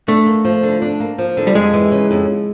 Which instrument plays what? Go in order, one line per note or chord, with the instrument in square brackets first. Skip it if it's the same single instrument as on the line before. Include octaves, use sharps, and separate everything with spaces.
[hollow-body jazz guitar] A3 [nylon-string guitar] D4
[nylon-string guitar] A#3
F3
D3
D4
A#3
F3
D3
[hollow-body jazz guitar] G3
[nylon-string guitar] F2 [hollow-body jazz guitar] G#3
[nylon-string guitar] E3
C#3
F2